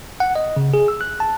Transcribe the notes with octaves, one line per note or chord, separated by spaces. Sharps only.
F#5
D#5
C#3
G#4
E6
F#6
A5